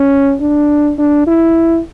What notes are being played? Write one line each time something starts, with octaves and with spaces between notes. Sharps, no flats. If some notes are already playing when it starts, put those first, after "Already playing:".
Already playing: C#4
D4
D4
E4